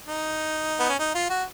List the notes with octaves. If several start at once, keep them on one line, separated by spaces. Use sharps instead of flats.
D#4
B3
C#4
D#4
F4
F#4